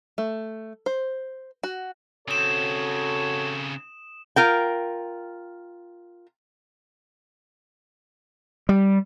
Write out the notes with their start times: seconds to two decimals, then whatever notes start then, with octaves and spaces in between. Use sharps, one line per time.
0.18 A3
0.86 C5
1.63 F#4
2.28 C#3 C4 F#4 A4 C#5 D#6 E7
4.36 F4 A#4 G5
8.69 G3